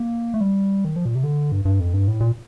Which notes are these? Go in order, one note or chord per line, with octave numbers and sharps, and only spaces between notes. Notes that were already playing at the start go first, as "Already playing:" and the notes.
Already playing: A#3
A3
G3
D#3
F3
A#2
C3
D3
G2
G2
F2
G2
A2
A#2